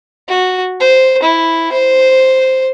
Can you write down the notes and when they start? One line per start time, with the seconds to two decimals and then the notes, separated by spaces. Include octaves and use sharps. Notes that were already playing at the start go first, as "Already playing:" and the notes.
0.28 F#4
0.80 C5
1.23 E4
1.72 C5